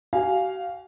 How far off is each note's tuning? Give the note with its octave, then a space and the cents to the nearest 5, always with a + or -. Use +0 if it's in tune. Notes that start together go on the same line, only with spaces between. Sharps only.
F#4 +45 F5 +0 G#5 +0